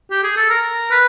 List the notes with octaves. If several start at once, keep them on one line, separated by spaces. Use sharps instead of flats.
G4
G#4
A4
A#4
B4